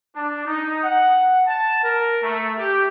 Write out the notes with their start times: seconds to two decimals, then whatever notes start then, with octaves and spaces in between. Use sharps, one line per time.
0.15 D4
0.46 D#4
0.84 F#5
1.47 A5
1.83 A#4
2.23 A3
2.58 G4